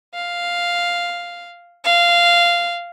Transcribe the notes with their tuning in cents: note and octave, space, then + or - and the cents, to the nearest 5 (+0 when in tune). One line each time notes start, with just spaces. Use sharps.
F5 +0
F5 -10